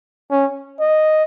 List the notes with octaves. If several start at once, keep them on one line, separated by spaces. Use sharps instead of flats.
C#4
D#5